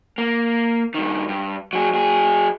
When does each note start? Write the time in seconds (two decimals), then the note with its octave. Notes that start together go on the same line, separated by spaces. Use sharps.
0.18 A#3
0.94 G2 D#3
1.29 G2
1.73 F#3 G#4
1.94 F#3 G#4